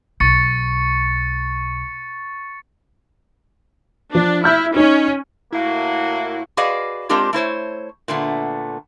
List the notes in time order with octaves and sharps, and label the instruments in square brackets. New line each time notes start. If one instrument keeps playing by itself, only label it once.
[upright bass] B1 [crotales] C#6 A6 C#7
[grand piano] F3 [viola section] D4
[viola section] E4 [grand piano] F6 G6
[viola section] C#4 [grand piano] D#4
[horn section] A2 A#3 F#4 [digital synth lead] E4
[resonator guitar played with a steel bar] F#4 G#4 B4 D5 D#5 F5
G#3 C4 D4 F4 G4 A#4
A3 E4 C5 C#5
A#2 D3 A3 B3